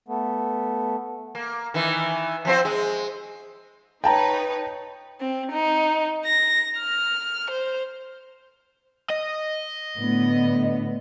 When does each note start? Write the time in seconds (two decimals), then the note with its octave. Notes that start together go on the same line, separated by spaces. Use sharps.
0.08 A3 B3
1.35 A#3
1.74 D#3 E3
2.45 F3 C4 C5
2.65 G#3
4.04 D#4 B4 C#5 G5 A5 A#5
5.21 C4
5.52 D#4
6.25 A#6
6.78 F6
7.51 C5
9.10 D#5
9.98 A2 D3 B3